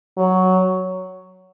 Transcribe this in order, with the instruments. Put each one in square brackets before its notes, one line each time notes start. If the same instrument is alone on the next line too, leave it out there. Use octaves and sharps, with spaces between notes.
[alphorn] F#3